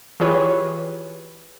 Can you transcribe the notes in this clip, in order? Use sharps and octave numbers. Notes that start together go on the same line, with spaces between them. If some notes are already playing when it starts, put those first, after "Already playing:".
E3 F4 G4 G#4 B4 C#5